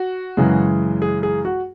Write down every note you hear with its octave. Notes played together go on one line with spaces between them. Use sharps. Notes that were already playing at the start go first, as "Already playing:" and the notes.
Already playing: F#4
F#2 C#3 E3 G#3
G#4
G#4
F#4